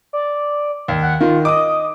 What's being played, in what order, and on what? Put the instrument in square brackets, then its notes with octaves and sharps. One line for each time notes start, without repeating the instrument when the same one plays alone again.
[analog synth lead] D5
[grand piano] D#2
[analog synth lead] F#5
[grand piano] D#3 [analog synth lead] F4
[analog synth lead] D#5 [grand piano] D6 D#6